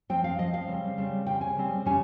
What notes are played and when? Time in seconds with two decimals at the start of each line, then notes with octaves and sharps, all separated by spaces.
0.09 F3 C4 G5
0.24 F5
0.38 F3 C4 D#5
0.54 F5
0.68 C#3 G3 C4
0.98 C#3 G3 C4
1.26 C#3 G3 C4 G5
1.41 G#5
1.56 C#3 G3 C4
1.86 C#3 G3 C#4 G#5